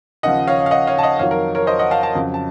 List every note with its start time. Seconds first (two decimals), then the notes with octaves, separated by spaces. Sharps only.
0.23 D#2 C#3 F3 D#5 F#5
0.47 C#5 F5
0.66 F5
0.71 D#5 F#5
0.87 C#5 F5
0.99 A5
1.03 D#5 F#5
1.19 F2 D#3 F#3 C#5 F5
1.31 A#4
1.55 A#4 C#5
1.67 C5 D#5
1.79 D#5 F#5
1.91 F5 A5
2.03 F5 A5
2.15 F2 C#3 F#3
2.34 A5